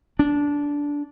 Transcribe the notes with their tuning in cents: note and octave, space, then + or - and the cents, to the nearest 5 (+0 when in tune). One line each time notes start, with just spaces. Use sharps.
D4 -15